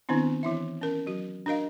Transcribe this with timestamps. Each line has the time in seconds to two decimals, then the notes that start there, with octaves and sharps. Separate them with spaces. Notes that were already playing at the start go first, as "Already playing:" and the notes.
0.09 D#3 B3 C4 D4 E4
0.43 E3 E4 E5
0.81 C#4 A#4
1.07 F#3 F#4
1.46 D4 F#4 A#4 D#5 F5